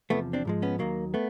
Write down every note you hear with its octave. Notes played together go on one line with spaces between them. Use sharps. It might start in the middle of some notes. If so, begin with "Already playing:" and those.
E2 C3 F3 A3 B3
C4 D4
G#2 F3 G#3
B3 C#4
D#2 D#3 F#3 A#3
A3 B3